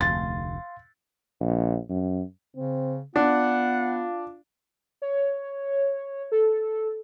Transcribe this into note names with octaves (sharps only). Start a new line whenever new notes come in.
F1 D2 F5 C6 A6
A#1
F#2
C#3 C4
B3 D4 F4 F#5
C#5
A4